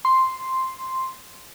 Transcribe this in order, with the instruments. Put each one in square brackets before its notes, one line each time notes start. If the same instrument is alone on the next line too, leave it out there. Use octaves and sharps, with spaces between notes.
[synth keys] C6